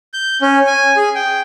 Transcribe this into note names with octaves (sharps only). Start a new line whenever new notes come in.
G6
C#4
G#5
G#4
G5